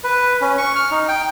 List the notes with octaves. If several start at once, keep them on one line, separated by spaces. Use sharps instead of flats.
B4
C#4
C#6
F6
D#4
G5